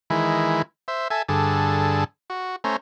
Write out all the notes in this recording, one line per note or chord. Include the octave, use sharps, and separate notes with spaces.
D#3 E3 G#3 E4
C5 E5
A4 E5 G#5
G2 D3 G#4 A4
F#4
A3 C#4 C5 A#5